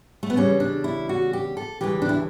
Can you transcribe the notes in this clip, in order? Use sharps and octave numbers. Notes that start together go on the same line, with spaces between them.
A3
B3
E2 C#3 G3 C#4
D4
E4
F#4
G4
A4
D2 C#3 E3 G3 G4
D4
E4